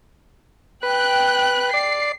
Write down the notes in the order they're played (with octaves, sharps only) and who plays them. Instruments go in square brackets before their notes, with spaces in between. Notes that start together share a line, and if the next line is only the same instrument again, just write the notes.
[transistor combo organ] B4 [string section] G5 F#6
[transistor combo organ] D5 [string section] C7